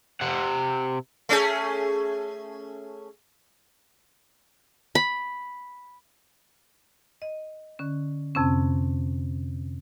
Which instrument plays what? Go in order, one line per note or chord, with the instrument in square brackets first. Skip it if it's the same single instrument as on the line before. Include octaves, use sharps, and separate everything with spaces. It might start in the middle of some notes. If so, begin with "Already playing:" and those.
[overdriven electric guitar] C3 F#5
[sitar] A3 C#4 G#4
[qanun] B5
[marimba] D#5
D3 C#4
F2 C3 C4 C#4